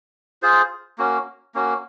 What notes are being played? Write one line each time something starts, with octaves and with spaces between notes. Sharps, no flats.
F4 G#4 C5
A#3 C#4 F#4
A#3 C#4 F#4